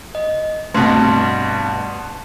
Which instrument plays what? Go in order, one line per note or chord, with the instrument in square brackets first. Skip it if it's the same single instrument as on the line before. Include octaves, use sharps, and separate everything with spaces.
[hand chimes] D#5
[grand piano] G2 B2 [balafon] A3 C4 [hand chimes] B4 C6